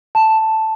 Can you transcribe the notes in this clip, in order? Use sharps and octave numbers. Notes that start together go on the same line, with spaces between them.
A5